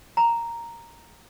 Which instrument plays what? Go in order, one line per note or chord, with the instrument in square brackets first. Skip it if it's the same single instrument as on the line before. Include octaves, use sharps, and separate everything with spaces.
[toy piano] A#5